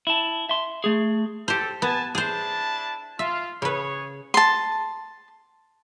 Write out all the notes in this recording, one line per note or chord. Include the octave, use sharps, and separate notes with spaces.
E4 A5
E5 C6
A3 G#4
G4 A4 C5
B3 G#5 A5
D4 E4 G#4 C5 A5
F4 E5
C#3 G#4 B4 C#5
A5 C6